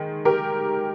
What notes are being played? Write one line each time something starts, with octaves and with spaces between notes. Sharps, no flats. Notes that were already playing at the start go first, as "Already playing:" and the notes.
Already playing: D#3 G#3
G4 A#4